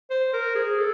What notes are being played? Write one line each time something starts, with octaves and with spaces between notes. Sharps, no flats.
C5
A#4
G#4
A4